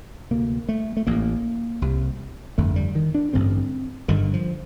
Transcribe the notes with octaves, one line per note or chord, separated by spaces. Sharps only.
D2 C3 A#3
A3
A3
A1 A2 A#3
C2 C3
G1 F2 D3 A3
G3
D#3
D4
A1 G2 D3 C4
G1 G2 D3 D#3
F3